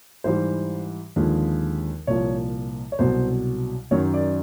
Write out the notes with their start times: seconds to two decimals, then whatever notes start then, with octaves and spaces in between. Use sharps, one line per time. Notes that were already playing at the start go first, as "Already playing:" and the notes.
0.24 G#2 E3 G3 C5
1.16 D#2 D3 F3 G#3
2.07 C2 A#2 F3 C#5
2.92 C#5
2.99 C2 B2 F#3 C5
3.91 F#2 D#3 F#3 C#5
4.14 D5